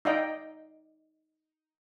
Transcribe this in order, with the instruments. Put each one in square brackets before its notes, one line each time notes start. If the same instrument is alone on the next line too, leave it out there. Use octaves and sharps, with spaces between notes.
[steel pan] D#4 D5 D#5 F5 G5